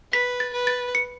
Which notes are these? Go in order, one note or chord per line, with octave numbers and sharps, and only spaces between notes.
B4 B6
A6
B4
A6
C#7